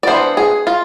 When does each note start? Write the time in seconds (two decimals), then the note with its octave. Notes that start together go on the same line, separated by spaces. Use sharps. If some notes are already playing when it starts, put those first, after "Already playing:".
0.03 D5
0.07 E3 B3 D4 C5
0.37 G#4
0.67 F4